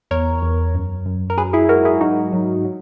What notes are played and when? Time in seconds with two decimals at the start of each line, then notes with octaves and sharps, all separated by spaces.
0.11 E2 A#4 C#5
0.42 E2
0.74 F#2
1.06 F#2
1.30 A#4
1.37 F#3 G#4 B4
1.53 E4 G#4
1.69 G#2 F#4 A#4
1.85 E4 G#4
2.01 F#3 D#4 F#4
2.32 F#3
2.64 F#3